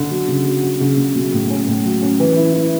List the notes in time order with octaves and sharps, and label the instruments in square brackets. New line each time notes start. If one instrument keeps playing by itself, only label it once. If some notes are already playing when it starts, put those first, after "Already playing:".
Already playing: [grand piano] D3
F#3
C#3
F#3
F#3
C#3
C#3
B1
A2
C#4
A2
F#3
C#4
E3
E4
E4